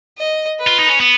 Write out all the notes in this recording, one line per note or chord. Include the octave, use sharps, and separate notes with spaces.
D#5
B4
F4
D#4
C#4
B3